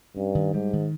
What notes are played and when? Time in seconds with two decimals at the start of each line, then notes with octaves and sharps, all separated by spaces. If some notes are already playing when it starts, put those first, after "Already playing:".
0.16 G2 C#4
0.35 D#3
0.54 G#2 G3
0.73 D#3